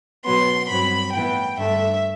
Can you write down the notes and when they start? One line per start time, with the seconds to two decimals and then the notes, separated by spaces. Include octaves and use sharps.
0.25 B2 F#3 B3 C6
0.69 G2 F#3 C4 B5
1.14 A2 E3 B3 G5
1.58 G2 D3 A3 E5